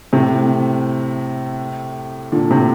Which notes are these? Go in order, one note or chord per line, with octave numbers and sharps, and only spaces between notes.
A2 C3
A#2 D3
A2 C3